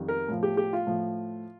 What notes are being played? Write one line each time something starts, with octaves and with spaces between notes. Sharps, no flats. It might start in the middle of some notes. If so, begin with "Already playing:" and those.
Already playing: F2 D#3 G3
A#4
A2 F3
G4
G4
F4
A2 F3